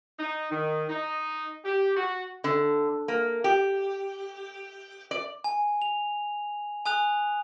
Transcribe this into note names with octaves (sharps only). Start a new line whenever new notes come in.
D#4
D#3
D#4
G4
F#4
D3
A#3
G4
D5
G#5
F7
G#5 D#6 F#6 F7